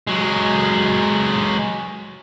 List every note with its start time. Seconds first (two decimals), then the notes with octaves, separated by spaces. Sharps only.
0.07 F#3 G#3